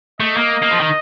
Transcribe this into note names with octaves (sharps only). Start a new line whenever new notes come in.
A3 D#5
A#3
A#3
F3
D#3